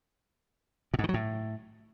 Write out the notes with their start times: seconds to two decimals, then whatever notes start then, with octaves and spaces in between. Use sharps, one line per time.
0.94 B2
0.99 G#2
1.04 D#3
1.09 F#3
1.14 A2